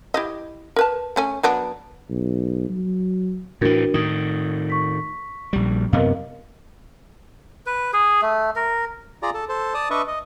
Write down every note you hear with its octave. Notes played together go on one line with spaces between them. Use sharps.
E4 G4 D#5
A#4 B4 A5
A3 C#4 G#5
F#3 B3 D4
B1
F#3
A2 E3 D4 F#4 A#4
A2 D#3 D#6
C#6 B6
A#1 G3
F#2 C3 B3 A#4 D#5 F5
B4
G#4
A3
A#4
F4 G#4 D5 A#5
A4
A4 C5
D5 A5 D#6
D4 B4 D#5 E5 C#6
D#5